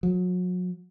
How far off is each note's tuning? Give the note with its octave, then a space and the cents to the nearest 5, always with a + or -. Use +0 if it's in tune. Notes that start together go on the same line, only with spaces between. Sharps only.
F#3 -35